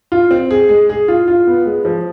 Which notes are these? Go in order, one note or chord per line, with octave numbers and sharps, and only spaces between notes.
F4
C4
G#4
G#3
G#4
F4
F4
B3
G#3
F3